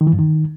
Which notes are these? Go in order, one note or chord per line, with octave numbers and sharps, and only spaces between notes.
D#3
E3
G2
D#3